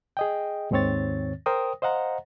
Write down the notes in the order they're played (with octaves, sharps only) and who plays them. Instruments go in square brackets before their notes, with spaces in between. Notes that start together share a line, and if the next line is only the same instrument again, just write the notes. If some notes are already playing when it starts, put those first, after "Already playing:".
[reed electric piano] G#4 D#5 G5
D#2 G#2 D#3 C4 C#5 A6
A#4 C5 G5 D#6
C5 D#5 F5 F#5 A#5